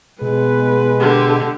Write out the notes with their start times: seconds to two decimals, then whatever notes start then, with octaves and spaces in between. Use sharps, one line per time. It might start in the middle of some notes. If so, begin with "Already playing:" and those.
0.21 B2 G#3 B3 B4
1.00 D3 G4